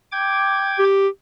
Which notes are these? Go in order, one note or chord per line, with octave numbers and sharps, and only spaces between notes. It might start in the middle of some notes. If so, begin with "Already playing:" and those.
G5 D6 G#6
G4